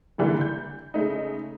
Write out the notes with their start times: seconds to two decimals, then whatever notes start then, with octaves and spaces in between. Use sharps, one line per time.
0.18 G#2 D3 E3 G3 A#3 E4
0.41 G6
0.94 C#3 G#3 A3 D#4